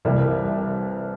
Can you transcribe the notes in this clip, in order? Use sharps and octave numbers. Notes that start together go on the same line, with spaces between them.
C2 C3 E3 G3 A#3